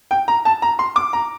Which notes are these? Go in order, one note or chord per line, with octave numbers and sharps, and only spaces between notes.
G5
A#5
A5
A#5
C6
D6
A#5